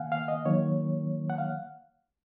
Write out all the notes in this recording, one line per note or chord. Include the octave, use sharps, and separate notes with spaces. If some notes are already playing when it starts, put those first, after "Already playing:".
Already playing: D#3 A#3 F5 F#5 G#5
F5
D#5
D#3 F#3 A#3 C#5
F#5
F5